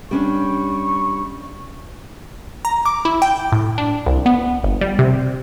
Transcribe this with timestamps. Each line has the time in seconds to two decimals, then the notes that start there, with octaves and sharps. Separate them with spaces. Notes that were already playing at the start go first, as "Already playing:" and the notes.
0.11 G3 C#4 D4 C#6
2.65 A#5
2.86 D6
3.05 E4
3.22 G5
3.52 A2
3.78 D4
4.06 C2
4.26 B3
4.63 G1
4.81 G3
4.99 C3